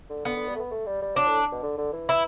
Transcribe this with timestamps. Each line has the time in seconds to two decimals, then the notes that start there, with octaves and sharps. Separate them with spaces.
0.10 D3
0.25 D3 B3
0.36 D3
0.48 G3
0.55 A3
0.59 B3
0.71 A3
0.86 G3
1.02 G3
1.16 F#3 D4
1.28 A2
1.52 B2
1.63 D3
1.78 D3
1.93 E3
2.09 E4